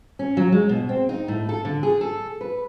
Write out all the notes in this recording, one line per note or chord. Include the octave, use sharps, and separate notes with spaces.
C#4
F#3
G#3
B2
C4
D#4
A2
A4
D3
G#4
A4
B4